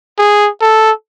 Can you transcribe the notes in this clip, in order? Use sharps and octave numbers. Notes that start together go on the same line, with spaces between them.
G#4
A4